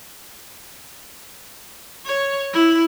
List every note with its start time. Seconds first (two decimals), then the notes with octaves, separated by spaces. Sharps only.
2.06 C#5
2.54 E4